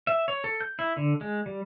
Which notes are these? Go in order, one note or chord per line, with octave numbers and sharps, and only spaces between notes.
E5
C#5
A4
G6
E4
D3
G#3
G3